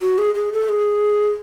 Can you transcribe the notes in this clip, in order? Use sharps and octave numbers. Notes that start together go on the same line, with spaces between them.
F#4
G#4
G#4
A4
G#4